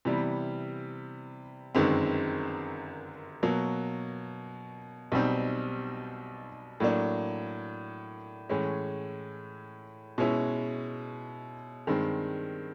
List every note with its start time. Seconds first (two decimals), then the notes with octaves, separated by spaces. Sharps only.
0.05 C3 E3 G3 B3
1.75 G1 F#2 D#3 G#3 C4
3.43 B2 F#3 A#3
5.12 B1 B2 G3 C4 D#4
6.80 A2 F#3 A#3 D4
8.49 A2 E3 G#3 C#4
10.18 B2 G#3 C#4 E4
11.87 G2 D#3 G#3 C4